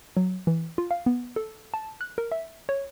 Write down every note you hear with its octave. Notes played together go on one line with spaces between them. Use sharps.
F#3
E3
F4
F5
B3
A4
A5
F#6
A#4
E5
C#5